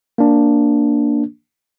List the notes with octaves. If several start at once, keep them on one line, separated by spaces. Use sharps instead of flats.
A#3 D4